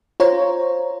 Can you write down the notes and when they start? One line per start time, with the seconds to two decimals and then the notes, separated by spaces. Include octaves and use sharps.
0.20 F4 C5 C#5 A#5